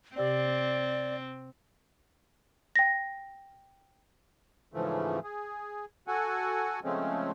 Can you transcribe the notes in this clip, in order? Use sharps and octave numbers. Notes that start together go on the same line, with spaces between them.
C3 C4 G4 D5 G5
G5 A#6
G#2 C#3 E3 F3 A3
G#4
F#4 A4 F#5 G#5
C#3 F3 G#3 A3 C4 C#4